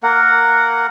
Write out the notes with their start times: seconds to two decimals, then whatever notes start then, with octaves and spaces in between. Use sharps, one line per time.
0.03 A#3 A#4 F#5